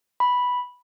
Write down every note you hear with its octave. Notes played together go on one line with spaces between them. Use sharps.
B5